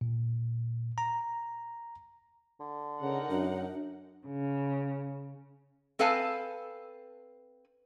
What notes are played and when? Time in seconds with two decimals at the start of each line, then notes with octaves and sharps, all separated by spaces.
0.01 A#2
0.98 A#5
2.60 D3
3.01 C#3 D#4 A#4 F#5
3.31 F#2 D4
4.25 C#3
5.99 C4 A4 B4 F5 G#5 A5